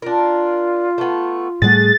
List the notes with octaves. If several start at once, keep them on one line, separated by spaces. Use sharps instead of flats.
D4 F4 A#4
A3 B3
A2 G3 A3 G#4 F#5 A6